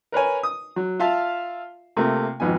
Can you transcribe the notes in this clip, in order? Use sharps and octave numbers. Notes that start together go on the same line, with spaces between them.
A#4 B4 C#5 G#5
D#6
F#3
F4 E5 F5 A5
C3 A3 A#3 F4
G#1 F2 G#2 B3 G#5